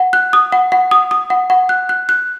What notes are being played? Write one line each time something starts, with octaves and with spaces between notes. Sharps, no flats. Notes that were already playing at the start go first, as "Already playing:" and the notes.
Already playing: F#5
F#6
D#6
F#5
F#5
D#6
D#6
F#5
F#5
F#6
F#6
F#6